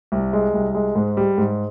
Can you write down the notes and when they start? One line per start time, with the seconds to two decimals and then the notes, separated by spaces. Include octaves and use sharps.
0.12 C2
0.33 G#3
0.54 C2
0.75 G#3
0.95 G#2
1.17 G3
1.38 G#2